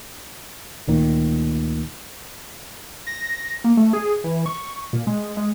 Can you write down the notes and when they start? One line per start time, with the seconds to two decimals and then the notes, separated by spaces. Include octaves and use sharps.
0.87 D2 A#2 D#3
3.07 A#6
3.64 A#3
3.77 A3
3.93 G#4
4.24 E3
4.46 C#6
4.93 A#2
5.07 G#3
5.37 G#3